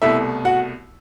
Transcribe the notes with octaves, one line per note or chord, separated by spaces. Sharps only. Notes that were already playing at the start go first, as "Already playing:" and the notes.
C2 B2 A3 E4 E5
F#4 F#5